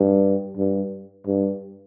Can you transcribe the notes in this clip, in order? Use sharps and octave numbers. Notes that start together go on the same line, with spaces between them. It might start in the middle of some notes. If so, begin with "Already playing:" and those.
Already playing: G2
G2
G2